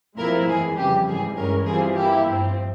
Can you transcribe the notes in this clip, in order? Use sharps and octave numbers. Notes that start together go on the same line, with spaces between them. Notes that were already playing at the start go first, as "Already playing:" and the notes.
A#2 F3 G#3 C4 E4 A#4
F2 E3 G#3 G#4
F2 C#3 E3 G3 G4
G#2 E3 G3 G#4
G2 E3 G#3 C#4 A#4
E3 G3 C4 F4 G#4
E3 A#3 E4 G4
G2 F3 C4